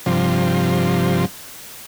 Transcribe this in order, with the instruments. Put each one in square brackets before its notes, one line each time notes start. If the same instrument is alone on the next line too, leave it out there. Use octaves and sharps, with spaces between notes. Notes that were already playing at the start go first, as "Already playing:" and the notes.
[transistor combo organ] G2 C3 F3